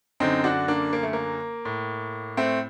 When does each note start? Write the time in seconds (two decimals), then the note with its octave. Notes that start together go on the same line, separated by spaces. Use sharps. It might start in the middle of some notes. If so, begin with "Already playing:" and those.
0.20 F#2 D3 C4 D#4
0.44 D4 F#4
0.68 A#3 D4
0.93 A#3
1.03 A3
1.13 A#3
1.65 A2
2.37 A3 C4